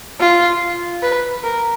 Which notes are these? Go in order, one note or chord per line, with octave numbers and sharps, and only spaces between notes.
F4
B4
A#4